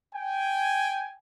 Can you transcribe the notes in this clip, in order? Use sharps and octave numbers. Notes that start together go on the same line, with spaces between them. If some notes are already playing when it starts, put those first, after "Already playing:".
G5 G#5